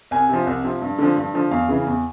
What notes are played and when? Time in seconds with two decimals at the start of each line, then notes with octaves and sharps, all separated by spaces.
0.11 C2 G#5
0.29 C3 F3
0.47 C2
0.64 C3 F3
0.81 G2
0.98 D3 F3
1.16 G2
1.34 D3 F3
1.51 E2 F5
1.69 C#3 E3
1.87 E2